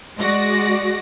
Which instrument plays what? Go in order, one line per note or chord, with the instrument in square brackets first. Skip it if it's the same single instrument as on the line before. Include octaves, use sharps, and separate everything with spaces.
[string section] G#3 F#4 D5 A#6